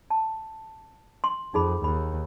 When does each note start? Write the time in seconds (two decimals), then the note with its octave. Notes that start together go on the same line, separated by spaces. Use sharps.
0.10 A5
1.24 C6
1.54 F2 D#4 G#4 B5
1.84 D#2 B5